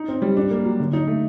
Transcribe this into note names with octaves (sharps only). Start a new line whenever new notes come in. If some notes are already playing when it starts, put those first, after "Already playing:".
Already playing: D#4
C4
G3
D4
A#3
F#3
D3
D#4
A3